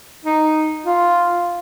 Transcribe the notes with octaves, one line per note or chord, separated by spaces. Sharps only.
D#4
F4